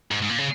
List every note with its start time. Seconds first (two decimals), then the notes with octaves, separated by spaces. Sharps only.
0.11 G#2
0.22 G#2
0.29 A#2
0.39 C#3